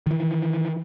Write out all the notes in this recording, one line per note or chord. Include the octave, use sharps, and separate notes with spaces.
D#3 E3